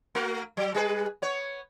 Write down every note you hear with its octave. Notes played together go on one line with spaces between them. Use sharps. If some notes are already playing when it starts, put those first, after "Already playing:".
A3 F#4 A#4
F#3
G3 G#4 B4
B3 C#5